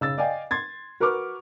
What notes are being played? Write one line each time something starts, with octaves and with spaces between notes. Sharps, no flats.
C#3 E6 A6
D5 D#5 F5 G5 G#5
C6 G#6 A6
F#4 A#4 B4 C#6 D6 F6